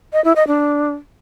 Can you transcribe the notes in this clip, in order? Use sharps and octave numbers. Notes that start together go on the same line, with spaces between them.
D#5
E4
D#5
D4